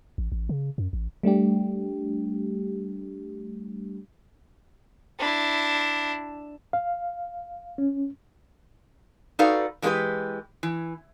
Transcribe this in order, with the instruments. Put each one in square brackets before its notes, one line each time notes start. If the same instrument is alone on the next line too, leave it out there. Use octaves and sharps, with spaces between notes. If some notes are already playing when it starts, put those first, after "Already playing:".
[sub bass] A1
A1
C#3
F#2
A1
[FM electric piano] G3 A3 D4 G4
[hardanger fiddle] D4 E4
[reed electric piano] F5
C#4
[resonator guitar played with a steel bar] D#4 F#4 A4 B4 D5 F5
E3 G#3 A#3 D4 G4 B4
E3